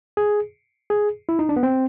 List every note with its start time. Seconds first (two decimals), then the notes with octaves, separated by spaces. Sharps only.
0.17 G#4
0.90 G#4
1.29 E4
1.39 D#4
1.49 D4
1.56 B3
1.63 C4